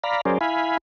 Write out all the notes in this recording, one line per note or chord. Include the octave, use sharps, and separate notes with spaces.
D5 F5 A#5 B5
F#3 C#4 G#4 A#4 C5 D5
E4 F5 G#5 B5